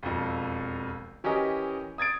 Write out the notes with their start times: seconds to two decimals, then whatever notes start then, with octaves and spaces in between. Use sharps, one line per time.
0.03 E1 F2
1.24 E3 C#4 G4 A#4 D#5
1.98 D#6 G#6 A6 D7